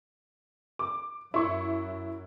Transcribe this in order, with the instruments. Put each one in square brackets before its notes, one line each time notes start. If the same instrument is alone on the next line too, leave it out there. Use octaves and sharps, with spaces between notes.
[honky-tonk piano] D6
[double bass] F#2 [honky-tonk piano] E4 C#6